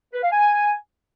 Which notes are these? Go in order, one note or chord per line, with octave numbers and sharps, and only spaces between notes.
B4
F5
G#5